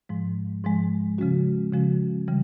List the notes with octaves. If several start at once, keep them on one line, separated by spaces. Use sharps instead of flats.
G#2 F3 G#3
G#2 F3 G#3
C#3 F3 G#3 C#4 F#4
C#3 F3 G#3 C#4 F#4
C#3 E3 G3